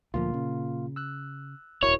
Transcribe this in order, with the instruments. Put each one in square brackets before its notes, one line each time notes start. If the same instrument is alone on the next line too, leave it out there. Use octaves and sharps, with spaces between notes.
[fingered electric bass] D2 E3 F3 [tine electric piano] A#2 A#3 F4
[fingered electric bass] C#3
[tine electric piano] E6 F#6
[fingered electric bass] D#1 G#1 [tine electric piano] E4 F#4 A#4 [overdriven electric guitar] C#5